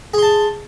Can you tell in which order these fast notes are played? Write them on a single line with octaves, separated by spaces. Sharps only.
G#4 C6 A5